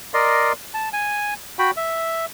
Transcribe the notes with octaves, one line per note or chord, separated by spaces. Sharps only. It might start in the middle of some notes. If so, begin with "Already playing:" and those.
A#4 D5 D#5 C6
A5
G#5
F#4 G5 B5
E5